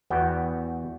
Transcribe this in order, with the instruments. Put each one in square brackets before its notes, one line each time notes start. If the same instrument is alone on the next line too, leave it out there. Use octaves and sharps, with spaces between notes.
[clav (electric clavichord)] E2 B3 F#4 G5